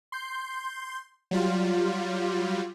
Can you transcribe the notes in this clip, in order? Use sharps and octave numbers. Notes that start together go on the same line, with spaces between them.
C6 G6
F#3 G3 F4